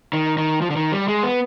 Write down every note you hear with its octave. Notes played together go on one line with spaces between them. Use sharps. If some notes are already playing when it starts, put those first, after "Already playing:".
D#3
D#3
F3
D3
D#3
G3
G#3
B3